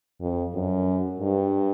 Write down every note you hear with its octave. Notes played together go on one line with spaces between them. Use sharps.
F2
F#2
G2